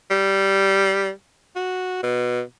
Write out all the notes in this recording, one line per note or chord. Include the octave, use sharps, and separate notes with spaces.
G3
F#4
B2